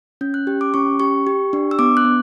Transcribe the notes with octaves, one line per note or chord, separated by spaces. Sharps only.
C#4 G6
F#6
G4
D6
C#4 C#6
G4 C#6
G4
D4
E6
B3 D6
F#6
B3